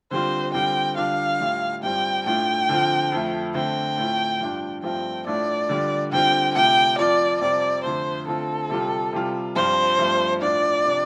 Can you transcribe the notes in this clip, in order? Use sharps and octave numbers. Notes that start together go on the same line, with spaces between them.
D3 G3 C4 F4 C5
D3 G3 C4 F4 G5
D3 G3 D4 F4 F5
A2 G3 F4
G2 G3 C4 F4 G5
A2 A3 D4 F4 G5
D3 F3 C4 F4
F2 F3 A3
D3 A3 C4 G5
A2 A3 C4 F4
G2 F3 D4 F4
G2 F3 A3 C4 F4 G5
A2 A3 D4 F4 D5
D3 G3 F4
D3 G3 C4 F4 G5
C3 A3 F4 G5
F2 F3 C4 F4 D5
F2 C3 G3 C4 F4 D5
F2 D3 F3 A3 C5
D3 A3 C4 F4 A4
C3 G3 F4
C3 G3 F4
G2 F3 C4 F4 C5
G2 F3 A3 C4
A2 F3 D4 F4 D5
C3 F3 D4